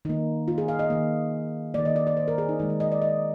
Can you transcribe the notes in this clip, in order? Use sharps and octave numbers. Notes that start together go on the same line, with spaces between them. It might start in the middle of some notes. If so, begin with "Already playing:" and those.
D#3 A#3 D#4
F4
G#4
F5
D#5
D#3 A#3
D#3 A#3 D5
D#5
D5
D5
C5
A#4
G#4
D#4
D#3 G#3 D#4
A#4
D#5
D5
D#5